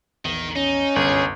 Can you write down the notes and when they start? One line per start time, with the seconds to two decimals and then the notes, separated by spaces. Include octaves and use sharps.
0.25 A#1 E2 D#3
0.56 C#4 D#4
0.96 G1 C2 F#2 G#4